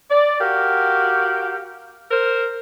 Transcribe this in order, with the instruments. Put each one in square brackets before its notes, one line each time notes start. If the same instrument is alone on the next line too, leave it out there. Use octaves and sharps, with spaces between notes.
[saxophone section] D5
F#4 G4 A#4 F5
A#4 C5